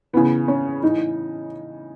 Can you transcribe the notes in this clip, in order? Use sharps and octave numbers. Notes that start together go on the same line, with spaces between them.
C#3 E3 B3
C#4
A2 E3 D#4